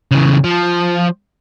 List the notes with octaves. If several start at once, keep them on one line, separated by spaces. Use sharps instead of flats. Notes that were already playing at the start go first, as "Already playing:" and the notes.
C#3 E3
F3